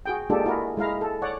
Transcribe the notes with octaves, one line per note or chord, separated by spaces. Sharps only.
F#4 G#4 G5
G#3 A#3 D4 F4 G4 A4
E4 F#4 G#4 A#4
G#3 E4 F5 A#5
A4
C#5 D5 F#5